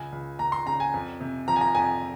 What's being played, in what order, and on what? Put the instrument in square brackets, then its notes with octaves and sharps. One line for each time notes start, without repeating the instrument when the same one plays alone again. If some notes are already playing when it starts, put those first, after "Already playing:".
Already playing: [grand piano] C#2 G#5
C#2
C#2 A#5
C6
C#3 A#5
G#5
F2
C3
F3 A#5
G#5
A#5
F2 G#5